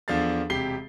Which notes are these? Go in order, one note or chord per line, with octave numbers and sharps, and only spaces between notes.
E2 F3 D4 A4 F5 A6
E1 C3 G4 C7 G7